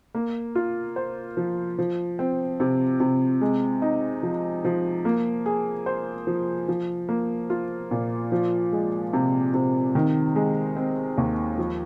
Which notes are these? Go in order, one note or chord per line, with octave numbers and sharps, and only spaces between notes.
A#3
F4
C5
F3
F3
C4
C3
C3
G#3
D#4
F3
F3
A#3
G#4
C5
F3
F3
A#3
F4
A#2
F3
G#3
C3
C3
D#3
G#3
C4
D#2
F3